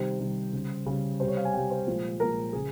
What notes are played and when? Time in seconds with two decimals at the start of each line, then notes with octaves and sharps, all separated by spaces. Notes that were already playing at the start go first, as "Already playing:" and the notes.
Already playing: C3 D#3 G3 C5
0.20 C3 D#3 G3
0.53 C#3 G3
0.86 C#3 G3
1.20 C3 G3 C5
1.28 C#5
1.37 F5
1.45 G#5
1.53 C3 G3 G5
1.70 C5
1.87 A#2 F3 G#3
2.20 A#2 F3 G#3 A#4
2.53 C#3 G#4